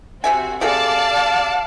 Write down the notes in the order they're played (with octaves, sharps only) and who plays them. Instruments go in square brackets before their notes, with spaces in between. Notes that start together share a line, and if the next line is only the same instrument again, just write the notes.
[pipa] C3 E5 G#5 [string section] C4 F#4
[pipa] C3 G#4 A4 [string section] D5 A5 [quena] F5